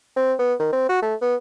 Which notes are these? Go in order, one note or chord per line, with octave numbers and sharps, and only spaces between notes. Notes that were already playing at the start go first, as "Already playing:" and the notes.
C4
B3
D#3
C4
F#4
A3
B3